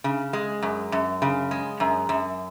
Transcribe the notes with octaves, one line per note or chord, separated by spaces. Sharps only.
C#3
G#3
F#2
F#2
C#3
G#3
F#2
F#2